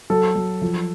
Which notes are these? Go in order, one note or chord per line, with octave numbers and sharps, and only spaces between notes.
F#3 A4
F#3
F3